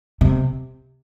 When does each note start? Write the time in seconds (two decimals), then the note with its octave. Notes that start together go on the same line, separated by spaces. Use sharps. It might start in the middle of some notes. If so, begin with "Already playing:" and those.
0.21 C3